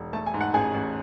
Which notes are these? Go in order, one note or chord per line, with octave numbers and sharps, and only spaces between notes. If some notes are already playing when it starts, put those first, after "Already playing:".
Already playing: E1
A3 A5
G#5
G#2
F#5
A1 G#4 G#5
A1